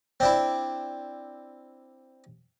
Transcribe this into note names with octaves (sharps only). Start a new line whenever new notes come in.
C4 D4 E4